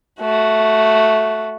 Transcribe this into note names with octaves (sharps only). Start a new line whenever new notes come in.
A3 F#4